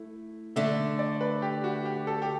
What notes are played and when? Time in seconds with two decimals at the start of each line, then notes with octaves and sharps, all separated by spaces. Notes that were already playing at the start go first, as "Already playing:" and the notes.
Already playing: A3 E4
0.56 D3 A3 D4 E5
0.99 D5
1.21 B4
1.42 G4
1.64 F#4
1.85 G4
2.07 A4
2.22 G4